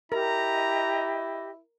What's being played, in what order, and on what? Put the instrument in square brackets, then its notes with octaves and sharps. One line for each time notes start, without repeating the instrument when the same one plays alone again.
[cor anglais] E4 [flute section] G4 D#5 [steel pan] A#4 [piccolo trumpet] A#5